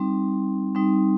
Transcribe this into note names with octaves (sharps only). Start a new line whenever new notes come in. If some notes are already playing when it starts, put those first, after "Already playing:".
Already playing: G3 C4 D#4
G3 C4 D#4